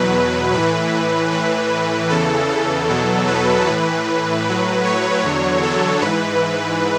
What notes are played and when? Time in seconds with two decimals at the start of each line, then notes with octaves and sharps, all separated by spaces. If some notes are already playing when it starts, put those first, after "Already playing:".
Already playing: E2 B2 F#3 B4
0.53 A2 E3 B4
1.32 A2 E3
2.10 E2 C#3 E3 A4
2.49 A4
2.88 E2 B2 F#3
3.27 B4
3.67 A2 E3
4.45 A2 F#3
4.85 C#5
5.23 E2 D3 F#3
5.63 A4
6.01 G#2 E3 B4